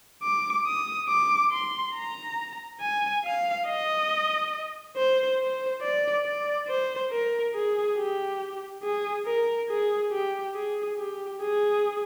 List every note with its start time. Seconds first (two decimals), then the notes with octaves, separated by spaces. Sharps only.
0.23 D6
0.66 D#6
1.08 D6
1.52 C6
1.95 A#5
2.80 G#5
3.25 F5
3.67 D#5
4.96 C5
5.39 C5
5.82 D5
6.25 D5
6.68 C5
7.11 A#4
7.54 G#4
7.97 G4
8.83 G#4
9.26 A#4
9.69 G#4
10.12 G4
10.55 G#4
10.98 G4
11.41 G#4